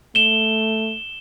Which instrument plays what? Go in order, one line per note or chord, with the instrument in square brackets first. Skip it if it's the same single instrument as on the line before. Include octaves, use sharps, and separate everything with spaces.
[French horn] A3 [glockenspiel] E7 G7